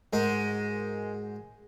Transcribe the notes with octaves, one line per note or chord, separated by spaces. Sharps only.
G#2 G#3 D#4 F#4 A#4